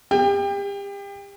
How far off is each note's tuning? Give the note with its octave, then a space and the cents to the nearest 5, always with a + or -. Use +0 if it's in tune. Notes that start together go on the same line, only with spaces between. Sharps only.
G4 +35 G5 +25